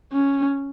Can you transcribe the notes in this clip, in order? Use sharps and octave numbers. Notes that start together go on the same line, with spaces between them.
C#4